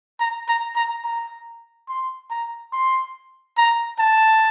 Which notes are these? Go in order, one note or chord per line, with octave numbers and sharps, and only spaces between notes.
A#5
A#5
A#5
A#5
C6
A#5
C6
A#5
A5